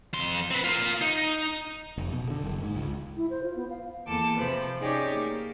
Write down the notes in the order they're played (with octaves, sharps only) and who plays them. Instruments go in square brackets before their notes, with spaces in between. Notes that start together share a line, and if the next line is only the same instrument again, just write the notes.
[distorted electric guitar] F2 C6
C4 B4
A#3 F4
D#4
[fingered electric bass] F1
B2
D3
F#1
G#2
C#2
[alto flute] E4
C5
F4
B3
F5
[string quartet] E2 A#3 A4 D6
C3 F3 B4
C#4 D#4 G4 G#4 C#5 D5
A#3